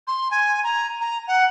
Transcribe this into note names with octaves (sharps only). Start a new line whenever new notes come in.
C6
G#5
A#5
A#5
F#5